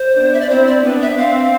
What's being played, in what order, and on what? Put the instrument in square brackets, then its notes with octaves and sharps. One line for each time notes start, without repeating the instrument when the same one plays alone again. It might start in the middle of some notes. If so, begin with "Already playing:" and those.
Already playing: [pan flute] C5
[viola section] B3 D4
[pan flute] E5
D5
[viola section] C4 E4 [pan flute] C5
[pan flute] D5
[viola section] B3 D4 [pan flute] B4
[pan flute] E5
[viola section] C4 [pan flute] F5